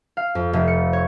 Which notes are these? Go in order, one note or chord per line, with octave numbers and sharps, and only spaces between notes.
F5
F2
F1
C#7
C#5